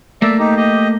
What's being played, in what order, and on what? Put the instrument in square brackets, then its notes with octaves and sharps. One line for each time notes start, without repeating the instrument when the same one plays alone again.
[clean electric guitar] A3 A#3 [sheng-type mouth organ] D5 E5
[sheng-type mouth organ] D#4 G4
G4 D#5